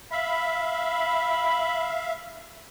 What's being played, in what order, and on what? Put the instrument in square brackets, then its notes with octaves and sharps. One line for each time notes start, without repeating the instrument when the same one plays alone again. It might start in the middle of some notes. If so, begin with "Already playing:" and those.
[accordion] E5 F5 [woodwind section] B5